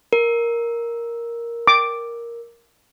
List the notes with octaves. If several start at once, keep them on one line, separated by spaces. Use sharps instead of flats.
A#4
D6